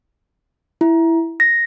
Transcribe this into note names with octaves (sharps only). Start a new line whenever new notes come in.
E4
A#6